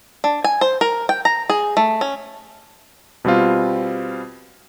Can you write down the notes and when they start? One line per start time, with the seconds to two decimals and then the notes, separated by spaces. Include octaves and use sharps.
0.24 D4
0.44 G#5
0.61 C5
0.81 A#4
1.09 G5
1.25 A#5
1.50 G#4
1.77 A3
2.01 C#4
3.25 B2 G3 C4 F4